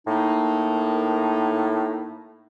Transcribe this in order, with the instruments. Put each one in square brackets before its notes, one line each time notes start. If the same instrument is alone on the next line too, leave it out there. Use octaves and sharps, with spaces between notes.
[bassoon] A2 [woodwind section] A#3 D#4